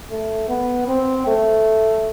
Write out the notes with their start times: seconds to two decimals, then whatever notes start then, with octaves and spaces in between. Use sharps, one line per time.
0.11 A3
0.48 B3
0.88 C4
1.27 A3